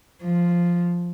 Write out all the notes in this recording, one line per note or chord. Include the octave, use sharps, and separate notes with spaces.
F3